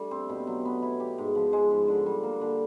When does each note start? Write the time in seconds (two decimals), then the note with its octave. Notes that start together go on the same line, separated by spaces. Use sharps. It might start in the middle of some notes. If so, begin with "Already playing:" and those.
Already playing: G3 A3 D4
0.11 C4
0.29 B2
0.47 F#3
0.65 B3
0.82 E4
1.00 G4
1.18 G#2
1.35 F3
1.53 G#3
1.71 G#2
1.88 D3
2.06 G3
2.23 A#3
2.41 D3